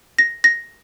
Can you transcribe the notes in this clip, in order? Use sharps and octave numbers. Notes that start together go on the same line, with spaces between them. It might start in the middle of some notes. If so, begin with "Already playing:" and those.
A#6
A#6